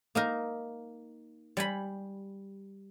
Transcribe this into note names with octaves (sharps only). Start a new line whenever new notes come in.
A#3 D#4 A#4
G3 G#5 B5